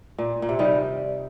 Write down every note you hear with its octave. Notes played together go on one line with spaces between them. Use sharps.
A#2
A#2
C3
D#3 G3